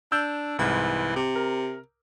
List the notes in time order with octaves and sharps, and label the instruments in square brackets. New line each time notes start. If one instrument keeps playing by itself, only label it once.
[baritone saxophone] D4 [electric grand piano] E6 G6
[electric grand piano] C2 G#2 [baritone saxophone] E3
[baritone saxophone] C3
[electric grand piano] A#4